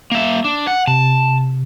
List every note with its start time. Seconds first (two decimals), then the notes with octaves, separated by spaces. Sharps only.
0.12 A#3 E5
0.44 D4
0.67 F#5
0.88 C3 A5